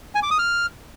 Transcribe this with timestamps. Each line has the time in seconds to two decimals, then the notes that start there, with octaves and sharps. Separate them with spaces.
0.15 G#5
0.23 D6
0.31 D#6
0.39 F6